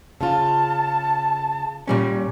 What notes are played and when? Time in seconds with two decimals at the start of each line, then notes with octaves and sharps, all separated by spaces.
0.21 C#3 F4 A5
1.87 A#2 G3 C#4 C#5